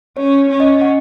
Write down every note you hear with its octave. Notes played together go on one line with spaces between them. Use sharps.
C#4 C#5
C#5
C#4
D#5
F#5